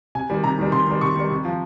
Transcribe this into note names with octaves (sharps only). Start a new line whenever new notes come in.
C3 G#5
D#3 G3
C3 A#5
D#3 G3
C3 C6
D#3 G3
C3 C#6
D#3 G3
C3
F3